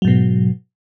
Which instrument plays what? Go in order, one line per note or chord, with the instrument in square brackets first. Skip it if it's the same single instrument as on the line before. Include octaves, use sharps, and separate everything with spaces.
[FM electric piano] F#3
G#2
B2